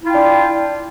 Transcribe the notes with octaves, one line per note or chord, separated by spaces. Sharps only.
D4 E4 F4 G5